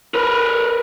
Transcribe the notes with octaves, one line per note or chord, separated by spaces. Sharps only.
A#4 B4